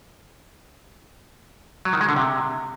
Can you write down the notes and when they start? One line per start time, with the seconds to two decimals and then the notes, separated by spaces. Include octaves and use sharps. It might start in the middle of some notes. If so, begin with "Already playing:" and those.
1.85 F#3
1.93 D#3
2.01 G#3
2.09 D3
2.16 C3